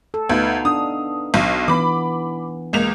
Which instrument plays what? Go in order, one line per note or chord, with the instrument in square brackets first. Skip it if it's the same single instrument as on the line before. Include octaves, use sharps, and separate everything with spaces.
[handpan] A4
[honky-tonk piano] D2 [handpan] B3 D#4 F5
[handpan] D4 [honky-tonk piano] D#6
[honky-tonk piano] B1
[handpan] E3 B3 [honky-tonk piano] B5 D6
[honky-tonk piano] C#2 A#3 F7 [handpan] G#3